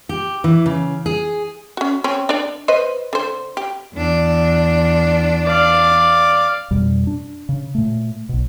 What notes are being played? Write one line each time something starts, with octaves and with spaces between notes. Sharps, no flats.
G4
E3
C#3
G#4
C#4 F#4
C4 C#4
D4 D5
B4 C5 D#5
D3 C5
G4
E2 D4
D5 F5
F2 B2 G3
D4
C#3
A#2 A3
B1 B2